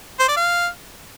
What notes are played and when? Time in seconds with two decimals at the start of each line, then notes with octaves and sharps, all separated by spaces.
0.20 C5
0.28 D5
0.37 F5